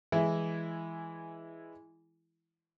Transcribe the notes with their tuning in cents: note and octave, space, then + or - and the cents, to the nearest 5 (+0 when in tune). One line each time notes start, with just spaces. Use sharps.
E3 +5 G#3 +0 E4 +0